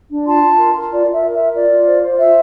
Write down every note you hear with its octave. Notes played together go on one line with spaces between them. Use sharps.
D4
F4 A5 C6
F4
A#4
A#4
F4 D5
F4
E5
A#4
E5
A#4
F4 D5
F4
C5
C5
F4 E5